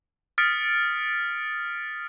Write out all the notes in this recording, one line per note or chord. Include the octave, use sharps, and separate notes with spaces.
D#6 F6 A6 B6 C#7 D7